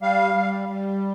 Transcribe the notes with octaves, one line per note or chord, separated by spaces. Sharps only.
G3 F5
G3
G3